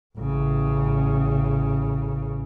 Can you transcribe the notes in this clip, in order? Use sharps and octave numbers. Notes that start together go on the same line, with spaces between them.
A1 C#3